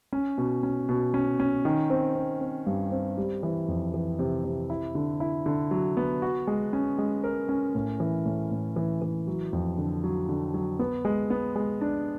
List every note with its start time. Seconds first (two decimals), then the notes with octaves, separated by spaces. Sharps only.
0.13 C#4
0.38 B2
0.63 C#4
0.89 B2
1.14 C#4
1.40 C#4
1.65 D#3
1.90 C4
2.15 C4
2.41 C4
2.66 G2
2.91 C4
3.17 G3
3.43 E3
3.68 F2
3.94 E3
4.19 C3
4.44 C3
4.70 E4
4.95 D3
5.20 E4
5.46 D3
5.71 F#3
5.97 B3
6.22 F#4
6.47 G#3
6.73 C#4
6.98 G#3
7.24 A#4
7.49 C#4
7.75 A2
8.00 E3
8.25 A2
8.51 A2
8.76 E3
9.02 E3
9.27 F#3
9.53 F2
9.78 D3
10.04 F#3
10.29 D3
10.54 F#3
10.79 B3
11.05 G#3
11.30 B3
11.55 G#3
11.81 D4